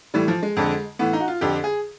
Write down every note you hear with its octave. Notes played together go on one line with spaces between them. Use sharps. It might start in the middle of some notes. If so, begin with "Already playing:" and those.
A2 E3 G3
F3
G#3
F2 D3
A2 E3 B3
D#4
F#4
F4
F2 D3 G4
G#4